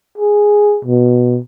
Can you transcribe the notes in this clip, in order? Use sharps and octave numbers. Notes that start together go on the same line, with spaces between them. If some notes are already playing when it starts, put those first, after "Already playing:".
G#4
B2